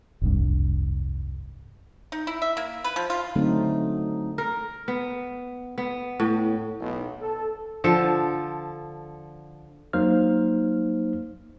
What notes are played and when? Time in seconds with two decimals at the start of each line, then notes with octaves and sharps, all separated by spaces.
0.22 F1 C2 G2
2.12 D#4
2.27 E4
2.42 E5
2.57 A#3
2.84 B4
2.96 F3
3.10 F4
3.36 D3 F#3 A3 C4 D#4
4.38 A#4
4.88 B3
5.78 B3
6.20 A2
6.80 B1
7.21 A4
7.84 D3 F3 A4
9.93 F#3 A#3 D#4 C5 F6